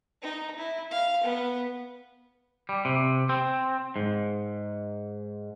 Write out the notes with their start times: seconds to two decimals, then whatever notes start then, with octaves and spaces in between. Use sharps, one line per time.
0.22 D#4
0.58 E4
0.91 F5
1.23 B3
2.69 G3
2.85 C3
3.29 C4
3.96 G#2